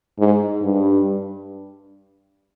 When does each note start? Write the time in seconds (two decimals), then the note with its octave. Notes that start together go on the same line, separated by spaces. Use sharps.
0.19 G#2
0.62 G2